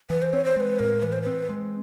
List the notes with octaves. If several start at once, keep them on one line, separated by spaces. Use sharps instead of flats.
E3 B4
C5
C4 C#5
C5
G#3 B4 C5
A2 A#4
E3 B4
C5
C4 B4
G#3